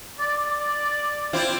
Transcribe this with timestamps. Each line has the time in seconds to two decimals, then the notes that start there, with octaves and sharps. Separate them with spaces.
0.20 D5
1.33 C4 E4 F4